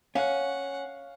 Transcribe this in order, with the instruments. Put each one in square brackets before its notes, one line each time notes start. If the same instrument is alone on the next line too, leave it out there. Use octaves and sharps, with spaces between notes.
[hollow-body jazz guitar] C#4 [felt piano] C#5 F5 [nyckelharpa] F#5